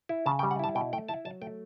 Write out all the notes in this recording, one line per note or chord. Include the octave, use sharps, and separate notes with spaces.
E4
C#3 A5
G5
G3
F#5
E4 A5
B2 G5
A3 G5
E4 A5
F#3 A5
A3 G5